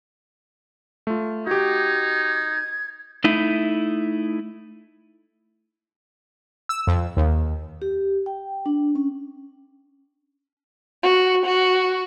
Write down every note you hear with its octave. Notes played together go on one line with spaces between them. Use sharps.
A3 F4
D#4 F#4 G4 G#6
A3 D#4 E4
E6
F2
D#2
G4
G5
D4
C#4
F#4
F#4